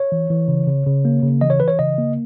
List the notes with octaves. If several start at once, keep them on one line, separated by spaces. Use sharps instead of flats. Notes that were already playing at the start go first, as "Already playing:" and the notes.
Already playing: C#5
E3
E3
C#3
C#3
C#3
A#3
C#3
E3 D#5
C#5
E3 B4
C#5
C#3 D#5
A#3